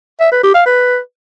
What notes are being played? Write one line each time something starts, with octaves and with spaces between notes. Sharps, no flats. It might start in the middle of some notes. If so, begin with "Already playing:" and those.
E5
B4
G4
F5
B4